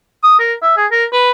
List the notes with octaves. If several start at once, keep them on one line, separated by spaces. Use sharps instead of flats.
D#6
A#4
E5
G#4
A#4
B4